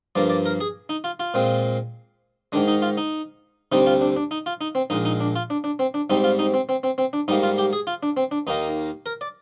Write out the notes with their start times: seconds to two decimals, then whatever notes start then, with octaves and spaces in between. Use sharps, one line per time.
0.15 G2 F3 A#3 D5
0.30 D5
0.46 A#4
0.61 G#4
0.89 D#4
1.04 F4
1.20 F4
1.34 A#2 G#3 C4
2.52 G#2 D#3 G#3 D4
2.68 D#4
2.82 F4
2.97 D#4
3.72 D2 C3 G3 C4 D#4
3.87 F4
4.01 D4
4.17 D4
4.31 D#4
4.46 F4
4.61 D#4
4.75 C4
4.90 A#1 A#2 G#3 D#4
5.05 D#4
5.20 D4
5.36 F4
5.50 D4
5.64 D4
5.79 C4
5.94 D4
6.10 G#2 G3 C4 D#4
6.24 F4
6.39 D#4
6.54 C4
6.69 C4
6.83 C4
6.98 C4
7.13 D4
7.28 G#2 G3 A#3 D#4
7.43 F4
7.58 G4
7.73 G#4
7.87 F4
8.03 D4
8.17 C4
8.31 D4
8.47 D#2 D#3 A#3 D#4
9.06 A#4
9.21 D5